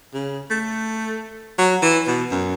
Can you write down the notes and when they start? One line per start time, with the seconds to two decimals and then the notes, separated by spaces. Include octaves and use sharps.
0.14 C#3
0.50 A3
1.58 F#3
1.82 E3
2.07 B2
2.31 F#2